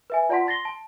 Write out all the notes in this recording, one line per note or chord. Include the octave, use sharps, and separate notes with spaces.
B4 E5 G#5
F4 D5 F#5 A5 C6 B6
C6 A6 A#6 C7 G7
A5